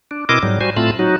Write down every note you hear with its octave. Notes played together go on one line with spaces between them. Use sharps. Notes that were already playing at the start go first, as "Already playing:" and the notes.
D4
B2 C4 E4 A#4 D#5 D6
G#2 F#3 G3
G3 F#4 C5 G#5
A2 A3 C4 F4 A5 B5
F#3 D#4 F#4